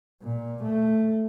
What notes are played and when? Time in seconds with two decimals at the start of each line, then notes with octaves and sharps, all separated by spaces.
0.22 A#2
0.64 A3